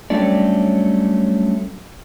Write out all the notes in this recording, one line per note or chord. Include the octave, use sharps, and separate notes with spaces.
F#3 G3 A3 C#4 D4 D5